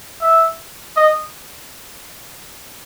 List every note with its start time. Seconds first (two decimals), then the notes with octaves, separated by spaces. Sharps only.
0.21 E5
0.97 D#5